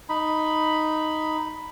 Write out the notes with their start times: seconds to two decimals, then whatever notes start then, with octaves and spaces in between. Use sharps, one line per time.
0.09 D#4 B5